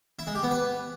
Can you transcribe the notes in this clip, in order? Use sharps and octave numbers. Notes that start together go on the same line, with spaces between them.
E4
G#3
G4
B3
B4